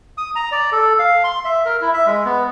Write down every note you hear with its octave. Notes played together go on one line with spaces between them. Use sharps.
D#6
A#5
D5
A4
F5
C6
E5
A#4
E4
E5
G#3
B3